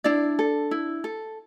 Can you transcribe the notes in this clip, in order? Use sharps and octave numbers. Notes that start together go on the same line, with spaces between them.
D4 E4 D5
A4
E4
A4